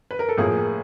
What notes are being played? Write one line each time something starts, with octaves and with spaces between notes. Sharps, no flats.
B4
A#4
A4
A2 F3 A#3 G#4